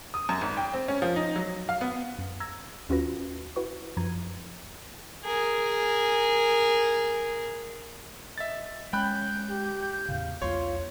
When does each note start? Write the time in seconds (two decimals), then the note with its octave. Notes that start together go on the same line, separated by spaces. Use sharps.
0.14 D#6
0.29 F#2
0.41 G#1
0.57 G5
0.74 C4
0.88 C#4
1.02 F3
1.16 D#4
1.36 F#3
1.69 F5
1.81 B3
2.18 F#2
2.40 A#5 E6 G#6 A#6
2.89 D#2 C#4 F4 F#4 B4 A#6
3.56 E4 F#4 B4 C#6
3.97 F#2 F3 A#5 G#6 D#7
5.25 G#4 A#4
8.38 D#5 E5 A6
8.93 G#3 C#4 G5 B5 F#6 G6
9.50 G4
10.08 E2 A2 C#3 F5
10.42 B1 E2 F4 C#5 C6